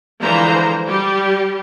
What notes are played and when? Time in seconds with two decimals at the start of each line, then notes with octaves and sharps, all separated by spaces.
0.21 D3 E3 F3 G#3 C5 A#5
0.85 G3 G4